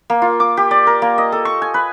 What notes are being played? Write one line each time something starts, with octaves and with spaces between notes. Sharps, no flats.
A#3
F4
D6
G4
D5
A#4
A#3
D#5
A4
C#6
G#5
B4